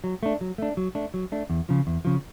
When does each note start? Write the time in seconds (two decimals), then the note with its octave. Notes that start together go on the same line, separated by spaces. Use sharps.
0.04 F#3
0.23 A3 D4
0.41 F#3
0.58 A3 D4
0.77 F#3
0.95 A3 D4
1.14 F#3
1.32 A3 D4
1.50 E2
1.69 C#3 F3
1.87 E2
2.05 C#3 F3